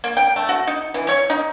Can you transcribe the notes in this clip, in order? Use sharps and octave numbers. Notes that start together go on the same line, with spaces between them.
A#3
G5
A3
F#4
D#4
E3
C#5
D#4